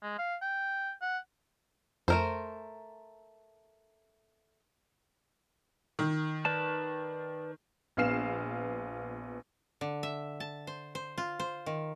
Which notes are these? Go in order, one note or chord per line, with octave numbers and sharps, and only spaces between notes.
G#3
F5
G5
F#5
F2 A3 A#4 C5
D#3
B4 D5 A5
A#1 B3 F5 F6 C7 E7
D3
E5
A5
C5
C5
F4
C5
D#3